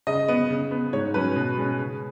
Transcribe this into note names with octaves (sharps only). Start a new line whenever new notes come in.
C#3 D#5
B3
C#3
B3
G#2 C#5
F#3 C#4 B4
B2
G#3 C#4
C#3